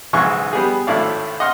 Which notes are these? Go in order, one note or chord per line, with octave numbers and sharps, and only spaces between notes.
B1 G#2 C#3 E3 C#6
G3 B3 G4 G#4
G#1 A2 A3 E4 D5 F5
D#5 F#5 C6 F6